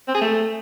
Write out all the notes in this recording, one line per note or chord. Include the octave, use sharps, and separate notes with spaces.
C4
G#4
A3